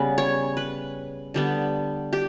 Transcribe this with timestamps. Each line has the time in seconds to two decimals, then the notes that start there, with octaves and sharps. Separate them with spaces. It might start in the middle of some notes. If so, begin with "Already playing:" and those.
Already playing: C#3 G3 B3 B4
0.18 C#5
0.57 B4
1.34 D3 G3 B3
2.13 G4